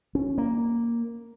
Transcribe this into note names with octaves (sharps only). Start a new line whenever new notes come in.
C#4
A#3